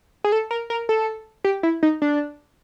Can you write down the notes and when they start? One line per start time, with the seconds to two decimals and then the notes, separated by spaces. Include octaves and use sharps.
0.24 G#4
0.32 A4
0.51 A#4
0.70 A#4
0.89 A4
1.44 G4
1.63 E4
1.83 D#4
2.02 D4